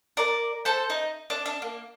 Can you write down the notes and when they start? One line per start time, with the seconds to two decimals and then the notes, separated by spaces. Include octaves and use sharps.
0.17 A#4 D5
0.65 A4 C5
0.90 D#4
1.30 D4
1.46 D4
1.62 A#3